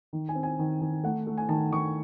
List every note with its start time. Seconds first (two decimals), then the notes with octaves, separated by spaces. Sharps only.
0.13 D#3
0.29 G#5
0.35 C4
0.43 G#5
0.59 D#3
0.81 D#3
1.03 A3 F#5
1.27 A3
1.38 G#5
1.49 D#3 A5
1.72 D#3 C#6